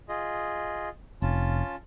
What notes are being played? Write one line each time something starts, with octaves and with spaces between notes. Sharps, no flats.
F4 G#4 D#5
F1 C#4 F4 A5